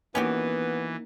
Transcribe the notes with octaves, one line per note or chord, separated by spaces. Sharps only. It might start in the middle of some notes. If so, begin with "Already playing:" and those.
E3 A#3 B3 C#4 D#4 F#4 G4 A#4